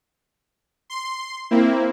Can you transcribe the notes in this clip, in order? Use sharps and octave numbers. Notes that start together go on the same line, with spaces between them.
C6
A#3 C4 E4